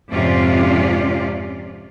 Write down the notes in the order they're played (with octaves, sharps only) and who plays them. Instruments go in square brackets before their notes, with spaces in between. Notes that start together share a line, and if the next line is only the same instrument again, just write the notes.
[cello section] F2 G#2 C3 C#4 F4 D5